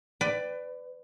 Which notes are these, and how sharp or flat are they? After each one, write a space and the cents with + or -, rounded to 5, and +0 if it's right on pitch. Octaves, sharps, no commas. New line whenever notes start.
B4 +25 D5 +10 G5 +0